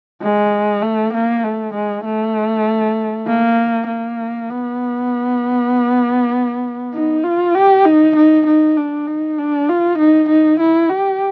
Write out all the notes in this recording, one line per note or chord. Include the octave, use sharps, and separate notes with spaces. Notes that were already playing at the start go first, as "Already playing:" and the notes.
G#3
A3
A#3
A3
G#3
A3
A#3
A#3
B3
D#4
F4
G4
D#4
D#4
D#4
D4
D#4
D4
F4
D#4
D#4
E4
G4